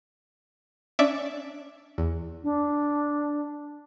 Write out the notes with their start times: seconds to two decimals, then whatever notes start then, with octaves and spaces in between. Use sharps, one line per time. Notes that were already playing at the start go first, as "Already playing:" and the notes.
0.99 C#4 D4 D5 E5
1.98 E2
2.43 D4